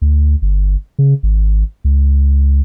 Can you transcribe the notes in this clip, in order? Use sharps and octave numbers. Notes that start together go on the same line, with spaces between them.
D2
G1
C#3
G#1
C#2